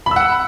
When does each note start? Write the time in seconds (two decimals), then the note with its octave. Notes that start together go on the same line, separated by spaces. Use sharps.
0.06 B5
0.11 E6
0.16 F#5